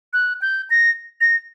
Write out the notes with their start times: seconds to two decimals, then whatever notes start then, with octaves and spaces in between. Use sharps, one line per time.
0.13 F#6
0.42 G6
0.70 A#6
1.21 A#6